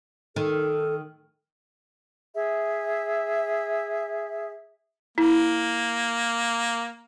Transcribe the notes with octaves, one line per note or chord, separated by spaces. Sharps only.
D#3 A4
G#4 E5
A#3 E4